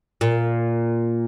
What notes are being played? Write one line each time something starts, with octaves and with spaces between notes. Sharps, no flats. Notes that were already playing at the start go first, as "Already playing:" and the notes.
A#2